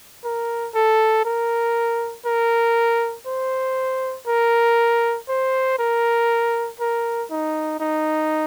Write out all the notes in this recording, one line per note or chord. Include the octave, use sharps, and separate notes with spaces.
A#4
A4
A#4
A#4
C5
A#4
C5
A#4
A#4
D#4
D#4